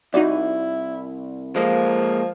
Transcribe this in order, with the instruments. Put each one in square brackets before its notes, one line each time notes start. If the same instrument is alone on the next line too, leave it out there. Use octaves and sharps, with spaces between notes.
[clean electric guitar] C2 [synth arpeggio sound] D#4 F#4 D5 [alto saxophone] E4
[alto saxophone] F3 [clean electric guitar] G#3 A#3